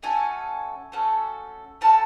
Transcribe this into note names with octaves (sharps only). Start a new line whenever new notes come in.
A3 C#4 F#4 A4 G#5
A3 C#4 F#4 A4
A3 C#4 F#4 A4 A5